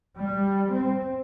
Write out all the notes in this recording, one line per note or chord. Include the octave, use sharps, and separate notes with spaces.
G3
C4